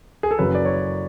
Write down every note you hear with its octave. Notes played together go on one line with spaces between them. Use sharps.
G#4
A4
F#1 F#2 C#3 F#3 B4
D5
C#5